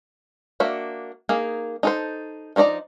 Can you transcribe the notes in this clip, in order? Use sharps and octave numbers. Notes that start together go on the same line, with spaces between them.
A#3 D4 F#4 E5
A#3 D#4 G#4
D#4 A4 C5
F3 A3 D#4 D5 A#5